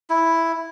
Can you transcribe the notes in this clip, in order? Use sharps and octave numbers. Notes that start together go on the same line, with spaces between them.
E4